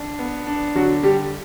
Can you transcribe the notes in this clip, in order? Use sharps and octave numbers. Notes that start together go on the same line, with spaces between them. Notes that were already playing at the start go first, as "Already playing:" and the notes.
Already playing: D4
B3
D4
D3 F#3 F#4
D3 G3 G4